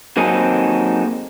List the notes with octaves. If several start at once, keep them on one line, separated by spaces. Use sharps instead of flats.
F#3 A#3 C4 D#4 G#4 A4